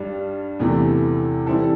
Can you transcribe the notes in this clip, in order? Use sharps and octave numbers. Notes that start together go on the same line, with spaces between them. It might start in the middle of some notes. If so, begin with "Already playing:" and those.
Already playing: G2 G3 D4
E2 C3 E3 A3
E3 G3 C4 E4 A4